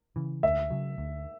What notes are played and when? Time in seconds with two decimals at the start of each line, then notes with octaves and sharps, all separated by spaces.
0.16 C#3 E3
0.43 D2 E5
0.71 C#3 F#3
0.98 D2